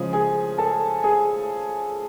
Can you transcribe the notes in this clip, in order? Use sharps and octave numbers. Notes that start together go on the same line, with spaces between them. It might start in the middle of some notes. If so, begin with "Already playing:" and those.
Already playing: C#3 F3 G#3 G#4
G#4 G#5
A4 A5
G#4 G#5